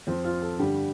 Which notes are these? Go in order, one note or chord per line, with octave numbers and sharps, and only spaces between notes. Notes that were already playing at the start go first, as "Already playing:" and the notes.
F2 F3 C4
F4
A4
G2 D3 G3 G4